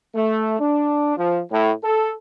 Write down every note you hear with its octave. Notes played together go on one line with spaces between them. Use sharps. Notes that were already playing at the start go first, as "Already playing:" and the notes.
A3
D4
F3
A2
A4